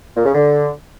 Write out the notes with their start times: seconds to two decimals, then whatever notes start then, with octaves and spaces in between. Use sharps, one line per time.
0.17 A#2
0.26 C#3
0.34 D3